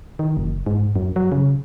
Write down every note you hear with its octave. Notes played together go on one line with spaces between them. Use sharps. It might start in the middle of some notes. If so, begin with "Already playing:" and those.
D#3
F#1
G#2
F#2
F#3
C#3